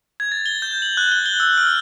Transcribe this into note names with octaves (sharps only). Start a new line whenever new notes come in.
G#6
A6
G7
G6
F#7
F#6
G7
G7
E6
F6